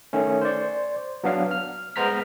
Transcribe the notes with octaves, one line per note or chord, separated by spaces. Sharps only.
D#3 A3 C#4
C5 D5
F#3 B3 D4 F5
F6
G#3 B3 C5 A#5 F6 B6